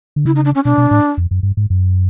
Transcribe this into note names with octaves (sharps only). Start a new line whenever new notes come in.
D3
C#3 E4
D#4
D4
C#4
B2 D4
B2
A2
F2
F#2
G2
G#2
F#2